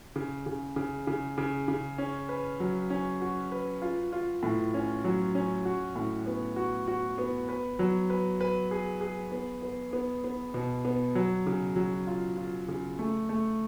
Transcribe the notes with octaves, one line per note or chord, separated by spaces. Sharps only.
C#3
C#3
C#3
C#3
C#3
C#3
C#4
B4
F#3
C#4
F#4
B4
F4
F4
A2
C#4
F#3
C#4
F#4
A2
B3
F#4
F#4
B3
B4
F#3
B4
B4
G#4
G#4
B3
B3
B3
B3
B2
B3
F#3
C#3
F#3
F4
F4
C#3
A3
A3